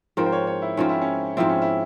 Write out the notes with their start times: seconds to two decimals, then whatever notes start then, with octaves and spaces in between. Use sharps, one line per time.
0.17 G#2 F3 C4 A#4
0.26 C5
0.32 C#5
0.47 C#5
0.62 E4
0.77 G#2 F3 C4 C#4
0.89 E4
1.01 C#4
1.37 G#2 F3 C4 E4
1.49 C#4
1.62 E4